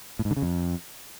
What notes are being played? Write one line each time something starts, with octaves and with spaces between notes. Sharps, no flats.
A2
G#2
D3
C#3
F2